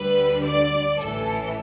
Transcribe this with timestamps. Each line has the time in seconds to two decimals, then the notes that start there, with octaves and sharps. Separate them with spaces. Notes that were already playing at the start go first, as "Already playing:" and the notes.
Already playing: D2 D3 G3 B4
0.45 D5
0.99 A1 A2 E3 A4